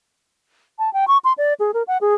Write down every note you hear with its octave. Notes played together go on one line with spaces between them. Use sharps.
A5
G5
C#6
C6
D5
G#4
A#4
F#5
G#4